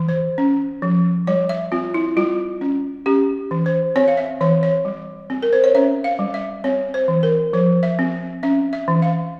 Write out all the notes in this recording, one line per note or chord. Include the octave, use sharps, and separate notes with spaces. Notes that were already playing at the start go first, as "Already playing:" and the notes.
Already playing: E3
C5
C#4
F3
G3 C#5
E5
C4 F4
E4
G3 F4
C#4
C#4 G4
E3
C5
C4 C#5
F5
E5
E3 C#5
C#5
G3
C4
A#4
C5
C#5
C#4 E5
F5
G3
E5
C4 C#5
C5
E3
A#4
F3 C5
E5
C4
C#4 E5
E5
E3
F5